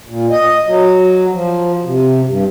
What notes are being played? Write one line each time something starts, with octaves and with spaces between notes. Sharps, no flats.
A#2
D#5
F#3
F3
C3
G2